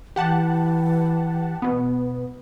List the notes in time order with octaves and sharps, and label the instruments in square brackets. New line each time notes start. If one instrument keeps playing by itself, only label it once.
[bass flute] E3 [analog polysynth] G4 F#5 A5
[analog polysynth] B2 B3